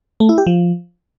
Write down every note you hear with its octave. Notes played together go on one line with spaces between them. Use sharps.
A3
E4
G4
F3